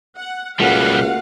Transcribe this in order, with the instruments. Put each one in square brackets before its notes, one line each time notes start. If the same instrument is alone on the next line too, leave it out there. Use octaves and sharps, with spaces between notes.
[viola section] F#5
[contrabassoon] C#2 [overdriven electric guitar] B2 G3 [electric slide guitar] A3 A#3 F#4 [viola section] F5 F#5